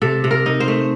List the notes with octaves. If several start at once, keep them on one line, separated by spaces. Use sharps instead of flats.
C3 A4
C3
A#4
D#4
C5
A3